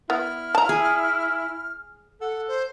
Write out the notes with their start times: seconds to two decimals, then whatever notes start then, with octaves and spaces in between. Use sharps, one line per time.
0.10 B3 E4 F6
0.55 A5 A#5
0.69 G#4
2.21 A4 F#5
2.48 C5